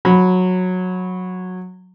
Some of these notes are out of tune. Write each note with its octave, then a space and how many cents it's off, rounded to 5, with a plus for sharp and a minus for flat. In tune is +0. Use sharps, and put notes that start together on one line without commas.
F#3 -15 B5 -5